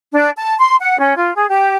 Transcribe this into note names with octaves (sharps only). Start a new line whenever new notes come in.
D4
A5
C6
F#5
C#4
F4
G#4
G4